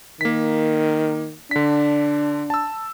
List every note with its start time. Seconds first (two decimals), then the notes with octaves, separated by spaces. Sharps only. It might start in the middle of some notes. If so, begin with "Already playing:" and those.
0.21 D#3 A#3 B6
1.51 D3 D4 B6
2.50 A5 E6